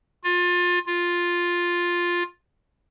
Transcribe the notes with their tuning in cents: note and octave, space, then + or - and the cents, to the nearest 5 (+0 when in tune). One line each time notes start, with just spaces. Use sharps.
F4 +25
F4 +5